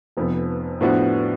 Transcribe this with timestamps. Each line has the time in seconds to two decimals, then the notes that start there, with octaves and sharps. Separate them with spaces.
0.17 F1 F2 F3 B3
0.81 A2 F3 B3 D4 F#4